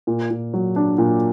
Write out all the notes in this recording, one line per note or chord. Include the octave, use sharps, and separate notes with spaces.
A#2
A#2
F#3
D4
A#2